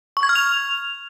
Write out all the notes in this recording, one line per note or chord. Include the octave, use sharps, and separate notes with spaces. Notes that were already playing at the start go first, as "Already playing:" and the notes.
C#6
G#6
F6
F7